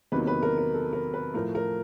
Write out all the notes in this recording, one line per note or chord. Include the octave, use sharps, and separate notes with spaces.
E2 C3 D#3 F#3 A#3 B4
B4
A#4
A#4
A4
A#4
B4
A2 F3 A3 A#4
A#4